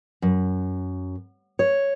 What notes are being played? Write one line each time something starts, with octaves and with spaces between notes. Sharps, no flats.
F#2
C#5